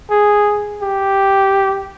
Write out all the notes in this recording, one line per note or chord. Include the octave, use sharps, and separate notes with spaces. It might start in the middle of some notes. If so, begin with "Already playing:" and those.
G#4
G4